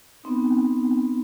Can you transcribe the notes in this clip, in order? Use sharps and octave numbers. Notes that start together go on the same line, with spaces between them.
B3 C4 D#4